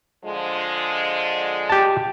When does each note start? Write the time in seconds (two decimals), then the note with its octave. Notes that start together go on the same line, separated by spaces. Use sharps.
0.24 D3 F3 G#3
1.70 G4 A5